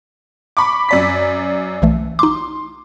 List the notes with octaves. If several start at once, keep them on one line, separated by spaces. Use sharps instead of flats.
B5 C#6 D6
F#2 D5 B6
B1 E3 A3
D#4 C6 D6